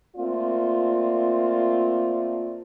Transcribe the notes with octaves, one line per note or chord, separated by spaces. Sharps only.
A3 A#3 C4 F4 D5